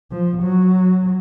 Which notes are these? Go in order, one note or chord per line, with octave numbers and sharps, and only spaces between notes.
F3
F#3